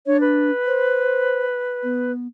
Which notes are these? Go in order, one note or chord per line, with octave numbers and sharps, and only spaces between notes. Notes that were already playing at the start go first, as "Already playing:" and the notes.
D4 C#5
B4
C5
B3